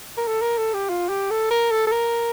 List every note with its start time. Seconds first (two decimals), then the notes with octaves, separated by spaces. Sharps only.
0.18 A#4
0.27 A4
0.42 A#4
0.58 A4
0.74 G4
0.89 F4
1.09 G4
1.31 A4
1.51 A#4
1.71 A4
1.87 A4
1.92 A#4